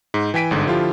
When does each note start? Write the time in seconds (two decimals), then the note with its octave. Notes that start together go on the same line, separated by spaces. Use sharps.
0.14 G#2
0.34 E3 G5 G#5 B6 D7 D#7
0.51 G1 G#2 D3
0.67 D3 F3 E4 F4 G4